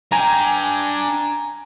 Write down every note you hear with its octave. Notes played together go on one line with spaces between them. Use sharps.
D4 G5 G#5 A#5